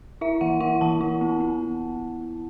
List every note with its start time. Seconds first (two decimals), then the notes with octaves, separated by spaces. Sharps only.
0.21 E4 E5
0.41 E3 F#5
0.60 E4 F#5
0.81 E3 A5
1.01 E4
1.21 B3
1.41 B3